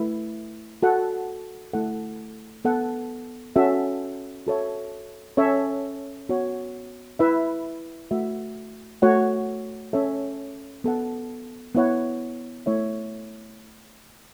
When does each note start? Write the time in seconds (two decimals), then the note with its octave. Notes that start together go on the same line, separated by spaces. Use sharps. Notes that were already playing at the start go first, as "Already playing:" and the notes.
Already playing: A3 E4 B4 E5
0.83 F#4 A4 F#5
1.73 A3 E4 A4 F#5
2.65 B3 A4 F#5
3.56 C#4 F#4 A4 E5
4.47 F#4 A4 C#5 E5
5.37 C#4 A4 C#5 E5
6.29 B3 F#4 C#5
7.19 E4 B4 E5
8.11 A3 F#4 B4 E5
9.02 A3 F#4 C#5 F#5
9.93 C#4 A4 C#5 E5
10.84 B3 A4 F#5
11.75 B3 E4 C#5 F#5
12.66 A3 E4 C#5 E5